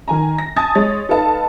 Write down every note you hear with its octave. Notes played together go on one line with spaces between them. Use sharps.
D#3 G#5 A#5
A#6
G#5 A5 D#6 A6
G#3 C#5 A6
D#4 A4 B4 F5 A5